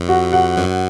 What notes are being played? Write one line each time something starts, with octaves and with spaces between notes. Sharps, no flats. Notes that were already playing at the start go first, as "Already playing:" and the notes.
Already playing: F2
F#4 F#5
F#4 F#5
F#2